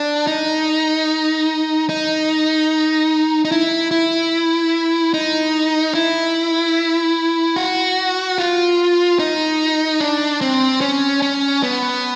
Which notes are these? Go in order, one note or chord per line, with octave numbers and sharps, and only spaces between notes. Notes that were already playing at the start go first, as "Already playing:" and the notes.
Already playing: D4
D#4
D#4
D#4
E4
E4
D#4
E4
F#4
F4
D#4
D4
C4
C#4
C#4
B3